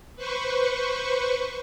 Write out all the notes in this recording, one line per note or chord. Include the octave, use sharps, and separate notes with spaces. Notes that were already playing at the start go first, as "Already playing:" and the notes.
B4 C5 C#6